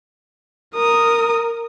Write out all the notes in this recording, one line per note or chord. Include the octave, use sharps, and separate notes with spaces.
A#4 D#6